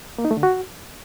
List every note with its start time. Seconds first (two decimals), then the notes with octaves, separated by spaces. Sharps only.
0.18 A#3
0.25 D#4
0.31 A3
0.37 D3
0.43 F#4